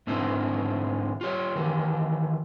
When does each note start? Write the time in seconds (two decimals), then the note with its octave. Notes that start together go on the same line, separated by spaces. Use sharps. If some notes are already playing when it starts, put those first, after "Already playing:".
0.07 G#2 D3 C4 D#4 E4
1.21 F4 G4 C#5
1.56 D#3 E3 G4